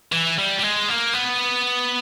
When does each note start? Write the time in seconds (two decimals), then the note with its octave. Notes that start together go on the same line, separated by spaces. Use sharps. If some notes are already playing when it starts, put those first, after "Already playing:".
0.12 E3
0.39 G3
0.59 G3
0.63 G#3
0.88 A#3
1.13 B3